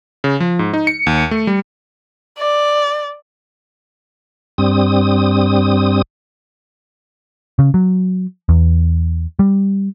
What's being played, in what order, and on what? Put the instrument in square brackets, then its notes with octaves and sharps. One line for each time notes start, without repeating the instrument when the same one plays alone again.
[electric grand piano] C#3
F3
G#2
D#4
C#7
D#2
A3
G3
[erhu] D5
[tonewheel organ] G2 G3 C4 D#6
[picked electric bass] C#3
F#3
E2
G3